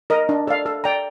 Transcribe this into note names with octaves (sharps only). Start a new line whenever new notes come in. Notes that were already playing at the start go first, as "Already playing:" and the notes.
A#4 D#5
D4
A4 D5 F5
A4
D5 G5 A#5